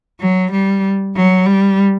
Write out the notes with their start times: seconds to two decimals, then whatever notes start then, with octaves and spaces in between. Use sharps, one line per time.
0.20 F#3
0.52 G3
1.16 F#3
1.46 G3